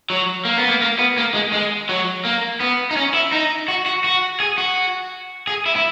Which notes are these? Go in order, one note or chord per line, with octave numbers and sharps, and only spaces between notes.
F#3
A#3
B3
A#3
A#3
B3
A#3
G#3
G#3
F#3
A#3
B3
D#4
C#4
E4
D#4
F#4
F#4
F#4
G#4
F#4
G#4
E4
E4